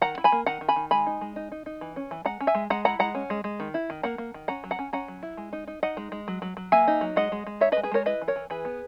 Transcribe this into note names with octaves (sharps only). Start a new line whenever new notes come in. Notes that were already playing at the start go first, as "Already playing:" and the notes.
D#3 F#5 A#5
E4
G#5 B5
A#3
D#3 F#5 A#5
D#3
G#5 B5
D#3
G#3 G#5 B5
D#4
G#3
D#4
D#4
D#4
E3
C#4
E3
G#3 F#5 A#5
C#4
E5 G#5
G#3
G#3 F#5 A#5
E4 F#5 A#5
G#3 F#5 A#5
C#4
G#3
G#3
D#3
E4
D#3
A#3 F#5 A#5
A#3
D#3
C#4 F#5 A#5
F#3
F#5 A#5
C#4
C#4 F#5 A#5
F#3
E4
G#3
D#4
D#4
D#4 D#5 F#5
G#3
G#3
F#3
F#3
F#3
A#3 E5 G#5
D#4
F#3
G#3 D#5 F#5
G#3
G#3
D#4 C#5 E5
B4 D#5
G#3
G#4 B4
G#3 A#4 C#5
E4 B4 D#5
E3
A#4 C#5
E3
E3 G#4 B4
B3